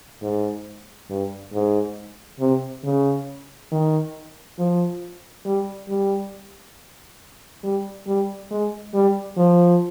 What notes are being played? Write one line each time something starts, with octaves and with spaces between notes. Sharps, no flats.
G#2
G2
G#2
C3
C#3
D#3
F3
G3
G3
G3
G3
G#3
G3
F3